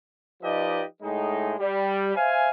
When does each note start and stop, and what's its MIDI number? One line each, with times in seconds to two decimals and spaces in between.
0.43 0.84 53
0.43 0.84 63
0.43 0.84 67
0.43 0.84 71
0.43 0.84 74
0.43 0.84 75
1.03 1.54 45
1.03 1.54 56
1.03 1.54 63
1.59 2.12 55
2.16 2.50 72
2.16 2.50 76
2.16 2.50 77
2.16 2.50 80